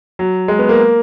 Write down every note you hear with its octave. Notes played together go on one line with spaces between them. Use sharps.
F#3
G#3
B3
A#3